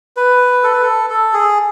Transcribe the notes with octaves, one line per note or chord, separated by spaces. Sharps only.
B4
A4
B4
A4
A4
G#4